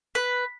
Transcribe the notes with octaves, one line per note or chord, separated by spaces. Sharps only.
B4